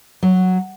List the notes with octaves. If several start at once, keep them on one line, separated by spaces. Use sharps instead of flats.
F#3